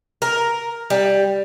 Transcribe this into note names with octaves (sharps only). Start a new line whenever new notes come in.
A#4
G3